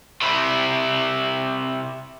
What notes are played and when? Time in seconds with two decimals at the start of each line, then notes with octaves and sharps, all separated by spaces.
0.21 C3 E4